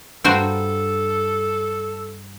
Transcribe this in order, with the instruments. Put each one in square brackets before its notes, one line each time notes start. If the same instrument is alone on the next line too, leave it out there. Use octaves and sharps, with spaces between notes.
[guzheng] G2 F4 A#5 [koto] F#4 C5 G5 [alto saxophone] A4